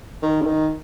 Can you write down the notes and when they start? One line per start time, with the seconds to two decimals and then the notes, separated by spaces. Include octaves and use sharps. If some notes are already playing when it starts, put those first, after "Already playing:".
0.23 D#3
0.42 D3
0.46 D#3